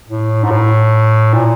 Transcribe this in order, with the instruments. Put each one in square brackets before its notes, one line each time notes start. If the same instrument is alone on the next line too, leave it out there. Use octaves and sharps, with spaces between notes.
[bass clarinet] A2
G#2
A2
A#2